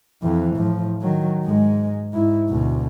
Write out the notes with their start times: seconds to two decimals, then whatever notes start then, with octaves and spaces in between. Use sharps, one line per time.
0.22 F2 E3
0.57 A2 F3
1.02 D#3 F#3
1.44 G#2 G#3
2.13 G#2 E4
2.48 D2 B2